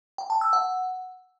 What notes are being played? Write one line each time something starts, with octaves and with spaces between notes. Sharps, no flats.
G5
A5
E6
F#5